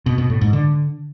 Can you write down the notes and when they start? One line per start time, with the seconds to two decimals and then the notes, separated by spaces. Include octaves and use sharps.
0.06 B2
0.18 B2
0.30 A2
0.41 G#2
0.53 D3